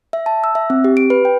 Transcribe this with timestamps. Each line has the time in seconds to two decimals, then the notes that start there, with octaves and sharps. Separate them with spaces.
0.13 E5
0.26 A5
0.44 E6
0.55 E5
0.70 C4
0.84 G4
0.97 D7
1.10 B4
1.25 G5